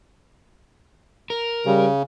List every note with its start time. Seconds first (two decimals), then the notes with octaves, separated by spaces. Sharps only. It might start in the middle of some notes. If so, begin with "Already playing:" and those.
1.30 A#4
1.66 C#3 G3